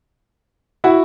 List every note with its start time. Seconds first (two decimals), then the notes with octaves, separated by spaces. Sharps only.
0.84 E4 F#4